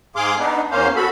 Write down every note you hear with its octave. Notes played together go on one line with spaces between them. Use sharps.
G#2 G#4 F5 C6 D6
B3 D4 D#4
E2 A#3 C#4 C5 F5
F#4 A4 B5